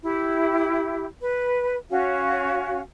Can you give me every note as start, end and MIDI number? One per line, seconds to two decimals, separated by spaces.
0.02 1.06 64
0.02 1.06 67
1.21 1.76 71
1.90 2.80 61
1.90 2.80 66
1.90 2.80 77